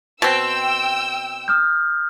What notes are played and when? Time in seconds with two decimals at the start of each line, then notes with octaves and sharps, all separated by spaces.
0.22 B2 C4 G5 E6
1.48 D#6 F6 G6